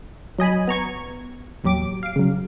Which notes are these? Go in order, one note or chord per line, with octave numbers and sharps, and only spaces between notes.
F#3 D#5 G#5 B5
B3 A#5 C#6 G#6
A1 D#2 F#3 G4 D6
F5 D7
C#3 F#3